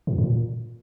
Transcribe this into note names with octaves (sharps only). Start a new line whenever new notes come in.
A#2
F2
A2
A#2